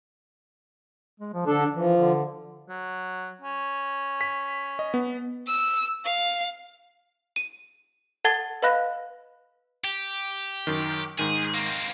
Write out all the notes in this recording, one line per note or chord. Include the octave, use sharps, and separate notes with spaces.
G#3
F3
D3 D4 A4
E3 F3
D3
F#3
C#4
B6
D#5
B3
E6
F5
D#7
A4 F#5 A5 G#6 A6 G7
B4 D#5 F5 B5 F#6 A#6
G4
F#2 D#3
G#2 D#3 G#4
A#3 C4